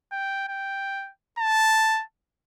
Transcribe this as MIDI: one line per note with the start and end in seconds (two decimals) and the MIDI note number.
0.12 0.47 79
0.48 1.10 79
1.39 2.03 81